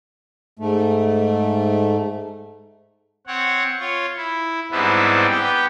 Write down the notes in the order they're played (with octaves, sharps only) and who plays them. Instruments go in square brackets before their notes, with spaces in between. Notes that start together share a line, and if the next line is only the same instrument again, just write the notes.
[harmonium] G#2 A3
[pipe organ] C4 C#5 F#5
F4 C#5
E4
G#2 G3 B3 C4 D4 E4
B3 G4 G5